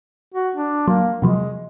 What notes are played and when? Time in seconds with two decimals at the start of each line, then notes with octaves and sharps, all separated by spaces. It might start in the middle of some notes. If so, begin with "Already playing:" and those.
0.34 F#4
0.56 D4
0.88 F#3 A#3
1.22 C3 F3 F#3 G#3